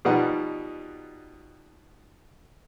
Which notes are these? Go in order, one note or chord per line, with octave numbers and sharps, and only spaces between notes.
B2 F3 G3 D#4 F#5